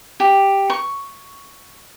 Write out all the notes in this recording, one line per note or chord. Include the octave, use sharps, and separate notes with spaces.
G4
C#6